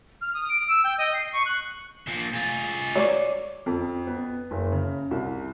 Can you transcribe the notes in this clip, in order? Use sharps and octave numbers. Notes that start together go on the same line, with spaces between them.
F6
D#6
D7
E6
G5
D#5
C7
C#6
F#6
A#2 F3
F4 G#4
C#5 D5
F2
B3
F#1
C#3
C2